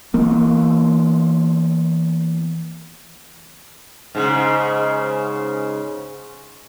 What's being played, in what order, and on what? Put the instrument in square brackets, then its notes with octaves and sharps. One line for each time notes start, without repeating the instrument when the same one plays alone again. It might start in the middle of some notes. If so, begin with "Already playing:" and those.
[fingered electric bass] E3 A#3 B3
[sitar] G#2 C#3